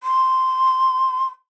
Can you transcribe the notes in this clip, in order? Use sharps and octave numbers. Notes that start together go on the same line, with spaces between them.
C6